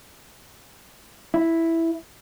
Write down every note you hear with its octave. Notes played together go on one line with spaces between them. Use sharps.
E4